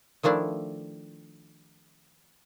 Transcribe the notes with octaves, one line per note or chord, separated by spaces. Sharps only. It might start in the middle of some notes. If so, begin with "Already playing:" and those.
D#3 F3 A3 D4 E4